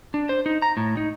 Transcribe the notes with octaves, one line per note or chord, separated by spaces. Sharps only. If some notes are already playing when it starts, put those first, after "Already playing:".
D4
C5
D#4
A#5
A2
D#4